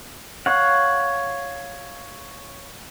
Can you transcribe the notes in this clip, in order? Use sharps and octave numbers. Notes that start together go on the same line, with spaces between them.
C#5 F5 F#5